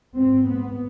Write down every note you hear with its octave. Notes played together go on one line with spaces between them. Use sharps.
G#2 C4
B3